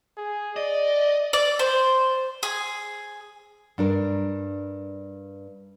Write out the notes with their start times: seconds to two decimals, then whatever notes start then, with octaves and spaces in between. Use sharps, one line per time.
0.17 G#4
0.56 D5 D#5
1.33 D5
1.59 C5
2.43 G#4
3.78 G2 D4 A#4